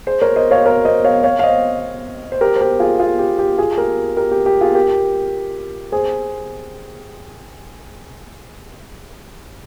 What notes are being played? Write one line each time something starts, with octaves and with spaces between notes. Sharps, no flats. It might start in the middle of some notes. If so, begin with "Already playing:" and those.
G#4 C5
A#4 C#5
C5 D#5
C#5 F5
A#4 C#5
C5 D#5
C#5 F5
C#5 F5
F5
C5 D#5
C5
G4 A#4
C5
G4 A#4
F4 G#4
F4 G#4
G4
G4
F4 G#4
G4 A#4
G4 A#4
G4
G4
F4 G#4
G4 A#4
G#4 C5